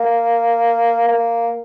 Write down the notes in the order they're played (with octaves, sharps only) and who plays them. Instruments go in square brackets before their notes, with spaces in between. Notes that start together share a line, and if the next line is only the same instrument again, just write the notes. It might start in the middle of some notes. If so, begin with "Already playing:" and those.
Already playing: [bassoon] A#3
A#3